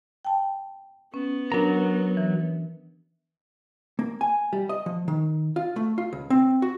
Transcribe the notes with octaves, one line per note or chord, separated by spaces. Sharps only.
G5 A5
B3 C#4
F#3 D4 A#4 A#5
E3
A#3
G#5
G3
D#5
F3
D#3
F4
A3
F4
C#2
C4
F#4